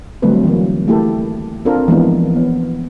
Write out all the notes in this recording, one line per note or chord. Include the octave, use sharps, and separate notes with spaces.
D3 F#3 G3 A3 C4 B4
D#3 E3 F#3 A#3
A3 A#3 E4 G4 A4
C4 D4 F4 A4 A#4
E3 F3 G#3 A#3 B3 D4
B3